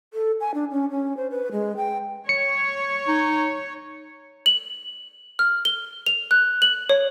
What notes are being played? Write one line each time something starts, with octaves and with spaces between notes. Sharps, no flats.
A4
G#5
D4
C#4
C#4
C5
B4
G#3
G5
C#5 C#7
D#4
F#7
F6
G7
F7
F#6
F#7
C#5